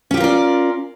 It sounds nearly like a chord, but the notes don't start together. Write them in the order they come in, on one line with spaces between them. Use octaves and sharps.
C#4 G4 F4 A#4 D5